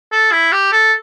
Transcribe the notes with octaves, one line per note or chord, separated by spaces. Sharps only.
A4
E4
G4
A4